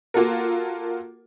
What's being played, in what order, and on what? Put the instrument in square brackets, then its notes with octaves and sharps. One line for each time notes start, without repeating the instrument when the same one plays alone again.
[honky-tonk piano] A#3 F4 F#4 A4 A#4